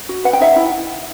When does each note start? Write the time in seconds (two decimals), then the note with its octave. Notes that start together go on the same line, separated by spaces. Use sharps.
0.09 F#4
0.24 B4 F#5
0.33 G5
0.40 D#4 E5 F#5
0.56 E4